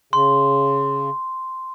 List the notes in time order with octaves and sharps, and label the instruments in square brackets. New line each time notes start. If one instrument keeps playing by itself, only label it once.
[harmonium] C#3 [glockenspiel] C6